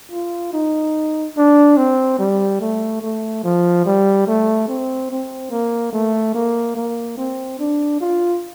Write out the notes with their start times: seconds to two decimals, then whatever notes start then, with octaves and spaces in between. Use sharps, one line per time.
0.12 F4
0.53 D#4
1.37 D4
1.77 C4
2.19 G3
2.61 A3
3.02 A3
3.44 F3
3.86 G3
4.27 A3
4.68 C4
5.10 C4
5.51 A#3
5.93 A3
6.35 A#3
6.76 A#3
7.17 C4
7.59 D4
8.01 F4